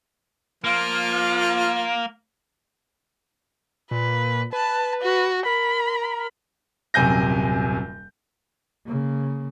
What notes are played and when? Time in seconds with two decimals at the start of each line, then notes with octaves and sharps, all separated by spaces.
0.64 F3 A#3 F4
3.91 A#2 B4
4.53 B4 A5
5.01 F#4
5.46 A#4 B5
6.94 D#1 F#2 C3 G#5 G6 A#6
8.86 C#3 A#3